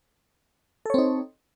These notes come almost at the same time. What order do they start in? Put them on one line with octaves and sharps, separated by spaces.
A4 C#5 C4 D#4